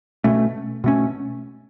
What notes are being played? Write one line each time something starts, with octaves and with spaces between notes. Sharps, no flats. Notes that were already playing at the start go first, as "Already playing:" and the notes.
B2 A3 C#4
B2 A3 C#4